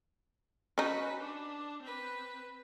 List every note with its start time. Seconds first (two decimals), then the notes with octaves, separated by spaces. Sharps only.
0.78 C#4 D#4 F#4 B4
1.20 D4
1.83 C4 B4